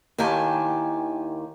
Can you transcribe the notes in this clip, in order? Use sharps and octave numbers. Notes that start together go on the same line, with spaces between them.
D#2 D#3 E4 G4 G#5 A5